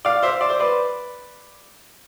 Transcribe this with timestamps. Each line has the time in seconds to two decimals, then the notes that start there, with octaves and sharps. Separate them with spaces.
0.05 D5 F5
0.23 C5 E5
0.41 D5
0.50 C5
0.60 B4 D5